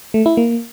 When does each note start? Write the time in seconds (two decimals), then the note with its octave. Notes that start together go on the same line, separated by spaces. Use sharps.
0.14 A3
0.26 E4
0.37 A#3